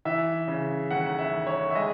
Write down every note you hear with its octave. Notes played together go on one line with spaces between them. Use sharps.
E3 E5
C#3
D#2 F#5
F#5
E5
D#2
C#5
E5
G#3 D#5